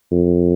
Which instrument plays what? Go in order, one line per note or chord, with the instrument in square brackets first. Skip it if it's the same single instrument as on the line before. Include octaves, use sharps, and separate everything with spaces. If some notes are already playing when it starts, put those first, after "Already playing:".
[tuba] F2